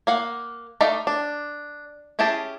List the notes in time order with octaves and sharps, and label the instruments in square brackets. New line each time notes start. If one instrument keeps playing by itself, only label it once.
[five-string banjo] A#3 F5 F#5
A3 D#4 D5 E5 F5
D4
C#4 E4 G4 G#4 A5